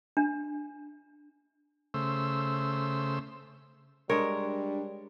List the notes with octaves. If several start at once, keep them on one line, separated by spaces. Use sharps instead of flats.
D4
C#3 A3 C5 E6
G3 G#3 D4 A#4 C#5